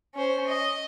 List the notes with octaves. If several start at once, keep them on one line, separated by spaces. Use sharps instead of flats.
C#4 C5
D#5